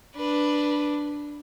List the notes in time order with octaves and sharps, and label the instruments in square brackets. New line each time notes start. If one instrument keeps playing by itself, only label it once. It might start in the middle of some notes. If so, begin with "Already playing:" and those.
[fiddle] D4 [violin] B4